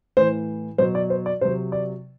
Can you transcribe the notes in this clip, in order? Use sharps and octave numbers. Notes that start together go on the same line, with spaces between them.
A2 E3 C5
B2 F#3 C5
D5
C5
D5
C3 F#3 C5
D5